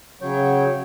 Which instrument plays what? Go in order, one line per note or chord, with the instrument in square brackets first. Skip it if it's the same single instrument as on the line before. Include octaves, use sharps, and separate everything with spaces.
[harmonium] C#3 F#3 C#5 G5